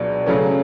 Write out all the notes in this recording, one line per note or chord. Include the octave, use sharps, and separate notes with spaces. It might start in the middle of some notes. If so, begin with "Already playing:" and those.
Already playing: C#2 B2 F#3 D4
C#3 F#3 A3 C#4